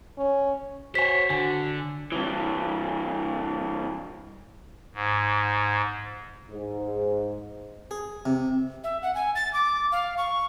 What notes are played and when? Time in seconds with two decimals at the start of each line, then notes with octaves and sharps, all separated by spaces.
0.18 C#4
0.95 F#4 C5 C#5 G#5 B6
1.30 D3 G#5
2.12 G2 E3
4.94 G#2
6.50 G#2
7.91 G#4
8.26 C3
8.84 E5
9.02 F#5
9.15 G#5
9.35 A6
9.53 D6
9.92 F5
10.18 C#6